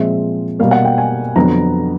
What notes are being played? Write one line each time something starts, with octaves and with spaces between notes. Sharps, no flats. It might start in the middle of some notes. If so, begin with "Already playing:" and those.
Already playing: A#2 F3 G#3 C4 E5
B2 G3 A#3 F5
F#5
G5
G#5
F2 D3 F#3 B3 A#5